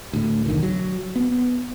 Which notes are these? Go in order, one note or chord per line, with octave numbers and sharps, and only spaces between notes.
D2 A2
B1 E2 D3 D#3
F#3
B3